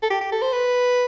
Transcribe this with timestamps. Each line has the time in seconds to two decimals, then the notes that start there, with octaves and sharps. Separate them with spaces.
0.02 A4
0.10 G4
0.21 G4
0.32 A4
0.42 C5
0.53 B4